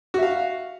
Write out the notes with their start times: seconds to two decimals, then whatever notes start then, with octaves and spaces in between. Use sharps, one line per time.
0.14 F#4
0.18 E5
0.23 F5